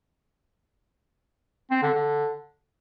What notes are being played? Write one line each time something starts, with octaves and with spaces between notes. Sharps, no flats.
C4
D3
D3